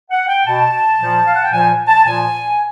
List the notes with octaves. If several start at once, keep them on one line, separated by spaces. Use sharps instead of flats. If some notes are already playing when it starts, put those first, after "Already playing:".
F#5
G5
B2 A5
A#2 F3
F5
F#5
G5
A#2 F3 G#5
A5
A#2 F3 G#5